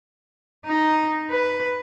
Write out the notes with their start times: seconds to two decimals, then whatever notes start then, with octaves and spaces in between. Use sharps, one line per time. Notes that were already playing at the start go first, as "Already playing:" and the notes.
0.66 D#4
1.30 B4